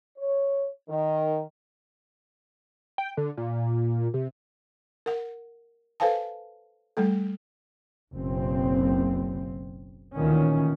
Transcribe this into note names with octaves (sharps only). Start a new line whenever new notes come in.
C#5
D#3
G5
D3
A#2
C3
A#4 F#5
A4 B4 C5 F5 G#5 A5
G3 A3 A4
F#1 B1 C4
D2 A#2 D#3 E3 C#4